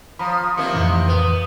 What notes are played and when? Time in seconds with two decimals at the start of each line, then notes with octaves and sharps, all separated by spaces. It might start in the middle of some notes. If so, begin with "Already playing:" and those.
0.19 F3 A#5 B5
0.57 C3 D#3 A#3 C#7
0.73 F2 A2 E3
1.08 B3